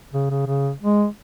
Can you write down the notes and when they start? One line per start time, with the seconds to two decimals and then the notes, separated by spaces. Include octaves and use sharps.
0.13 C#3
0.30 C#3
0.47 C#3
0.82 G#3